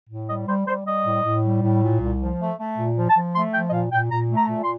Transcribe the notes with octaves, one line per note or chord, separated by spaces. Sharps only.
A2
G3 D#5
G3 C5
G3 C5
G3 D#5
A2
A2
G3
A2
A#2
C2
F3
A3
A3
A#2
F3
A5
F3
A3 C6
F3 G5
D#5
A#2 F5
A#2 G5
A#2 A#5
A3
A#5
A#2
C6